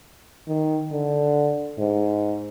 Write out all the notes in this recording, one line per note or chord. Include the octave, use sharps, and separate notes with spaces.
D#3
D3
G#2